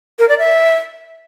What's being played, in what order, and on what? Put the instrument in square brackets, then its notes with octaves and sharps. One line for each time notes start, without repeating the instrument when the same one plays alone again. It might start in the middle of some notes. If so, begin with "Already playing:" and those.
[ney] A#4
D5
E5